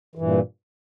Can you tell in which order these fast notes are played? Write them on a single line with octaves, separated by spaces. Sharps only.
E3 G2 A#2